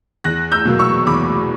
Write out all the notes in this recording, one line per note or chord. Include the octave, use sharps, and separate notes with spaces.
E2 F#6 A#6
E6 G6
B2 F#3 A#3
C#6 E6
E2 B5 D6